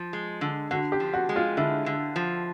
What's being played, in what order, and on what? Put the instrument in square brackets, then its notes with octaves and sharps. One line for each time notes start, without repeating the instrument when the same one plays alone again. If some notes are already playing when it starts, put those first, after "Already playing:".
Already playing: [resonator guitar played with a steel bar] F3
G#3
D3
[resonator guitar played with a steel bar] D3 [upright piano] F#4
[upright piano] G4
[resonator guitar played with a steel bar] F3
[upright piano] F#4
[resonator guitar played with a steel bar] G#3
[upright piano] F4
[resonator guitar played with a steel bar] D3 [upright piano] E4
[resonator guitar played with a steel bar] D3
F3